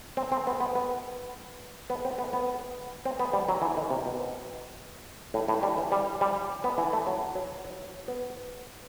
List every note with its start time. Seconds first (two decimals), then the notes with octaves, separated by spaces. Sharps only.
0.17 C4
0.32 C4
0.47 B3
0.60 B3
0.75 B3
1.90 B3
2.05 C4
2.18 B3
2.33 B3
3.05 C4
3.19 B3
3.33 G3
3.49 F#3
3.62 E3
3.77 D#3
3.91 C3
4.06 B2
5.34 A2
5.48 A2
5.63 G3
5.78 E3
5.92 G3
6.21 G3
6.64 B3
6.78 E3
6.93 A3
7.07 F#3
7.35 F#3
7.65 F#3
8.08 B3